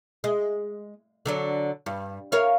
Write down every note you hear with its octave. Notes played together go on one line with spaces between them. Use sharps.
G#3
D3 F#3 D4
G2
A#4 C#5 F5